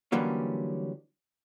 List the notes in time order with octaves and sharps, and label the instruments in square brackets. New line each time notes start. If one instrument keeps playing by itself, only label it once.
[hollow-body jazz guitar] D3 E3 F#3 G3 A#3 C#4